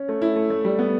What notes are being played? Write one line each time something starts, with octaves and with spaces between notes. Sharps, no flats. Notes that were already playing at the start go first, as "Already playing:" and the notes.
Already playing: C#4
A3
E4
A3
A3
G3
B3